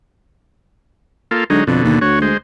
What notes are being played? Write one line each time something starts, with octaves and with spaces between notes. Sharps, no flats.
A#3 F4 A4
D3 F#3 G#3 D#4
F2 B2 D3
D#2
D2 F#4 C#5
G#3 C5